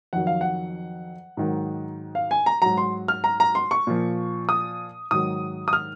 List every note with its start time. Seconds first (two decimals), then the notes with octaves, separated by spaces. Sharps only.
0.13 F2 D#3 F#3 F#5
0.27 F5
0.41 F#5
1.37 G#2 D#3 F#3
2.15 F5
2.31 G#5
2.46 A#5
2.62 G#2 F#3 A#5
2.77 C6
3.08 F6
3.24 A#5
3.40 A#5
3.55 C6
3.71 C#6
3.87 A#2 F3
4.49 D#6
5.11 G#2 D#3 F#3 D#6
5.68 D#6
5.73 F6